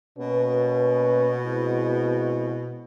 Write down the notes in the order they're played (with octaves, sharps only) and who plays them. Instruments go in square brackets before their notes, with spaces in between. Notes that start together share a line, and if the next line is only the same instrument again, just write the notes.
[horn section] B2 [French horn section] A#3 C#4 B4
[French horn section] G#3 C4 E4